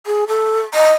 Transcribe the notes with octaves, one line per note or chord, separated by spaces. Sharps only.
G#4
A4
D#5